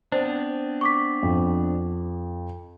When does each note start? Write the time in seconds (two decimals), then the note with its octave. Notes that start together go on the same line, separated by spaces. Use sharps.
0.12 B3 C4 D4 C5
0.81 C#6 D6 B6
1.23 F2